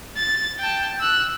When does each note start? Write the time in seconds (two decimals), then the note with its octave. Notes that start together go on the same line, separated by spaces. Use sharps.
0.17 A6
0.59 G5 A5
1.00 E6 F#6